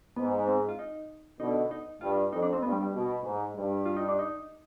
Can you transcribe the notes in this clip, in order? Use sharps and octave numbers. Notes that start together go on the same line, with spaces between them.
G#2 B3
C4
F4
D#4
B2 D3 D#4
D#4
G2 F4
F2 D#4
D4
C4
G2 B3
G3
G3
B2
G#2
G2
F4
D#4
D4
D#4